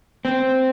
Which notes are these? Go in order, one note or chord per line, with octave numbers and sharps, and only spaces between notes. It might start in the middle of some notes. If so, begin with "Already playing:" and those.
C4